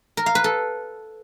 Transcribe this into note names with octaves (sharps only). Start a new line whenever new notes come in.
A#4
F5
B4
A4